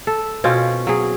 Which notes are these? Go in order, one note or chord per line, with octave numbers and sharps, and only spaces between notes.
A4
B2 C4 C#4 F4
F#3 G#4